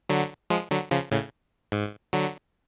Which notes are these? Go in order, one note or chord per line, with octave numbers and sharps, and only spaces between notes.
D3 F#3
F3 G#3
D3 F#3
C#3 F3
A2 C#3
G#2
D3 F#3